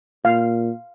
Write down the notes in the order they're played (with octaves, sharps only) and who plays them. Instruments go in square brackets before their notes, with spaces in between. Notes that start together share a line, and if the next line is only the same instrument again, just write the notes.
[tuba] A#2 [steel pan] F5